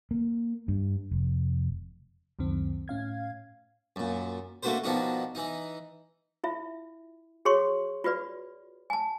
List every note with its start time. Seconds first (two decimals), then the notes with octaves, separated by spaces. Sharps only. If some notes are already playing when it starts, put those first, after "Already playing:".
0.11 A#3
0.68 G2
1.11 F1
2.39 C#2 F#2 D#3 C4
2.88 A2 C#4 F5 G#6
3.96 F#2 A#2
4.63 A3 A#3 D4 F#4 B4 C5
4.84 B2 D#3 F3 D4 D#4 F#4
5.35 E3 D#4
6.44 E4 F4 E5
7.45 F#4 G#4 C#5 C6 C#6
8.04 F4 F#4 B4 D5
8.90 G#5 A5